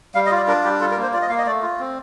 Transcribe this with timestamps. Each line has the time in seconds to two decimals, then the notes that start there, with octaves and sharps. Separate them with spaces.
0.15 G3 F5
0.26 D#5
0.31 F4
0.37 D5
0.48 D4 A#4
0.64 G3 G4
0.80 F4 A4
0.91 A#4
0.97 A#3
1.02 C5
1.13 F4 D5
1.22 D#5
1.29 A#3 F5
1.38 D#5
1.46 A3 D5
1.63 F4
1.79 C4